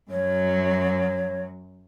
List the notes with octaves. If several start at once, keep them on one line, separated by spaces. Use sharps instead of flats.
F#2 F#3 C#5